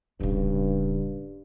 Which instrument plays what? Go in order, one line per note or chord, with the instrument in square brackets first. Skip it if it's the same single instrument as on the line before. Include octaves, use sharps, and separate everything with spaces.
[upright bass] D1 C#3 [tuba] G2